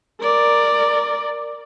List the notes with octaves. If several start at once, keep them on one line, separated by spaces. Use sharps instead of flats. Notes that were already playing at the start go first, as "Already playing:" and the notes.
A#4 D5